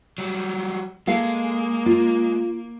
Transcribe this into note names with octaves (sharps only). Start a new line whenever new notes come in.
F#3 G3
G#3 A#3 A4 F5
F4